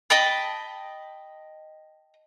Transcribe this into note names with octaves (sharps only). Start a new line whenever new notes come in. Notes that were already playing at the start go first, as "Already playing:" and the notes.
D#5 G5 A5 B5